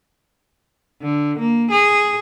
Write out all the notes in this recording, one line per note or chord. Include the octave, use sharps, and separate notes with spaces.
D3
A#3
G#4